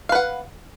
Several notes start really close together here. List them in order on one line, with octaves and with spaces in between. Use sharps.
F5 B4 F#5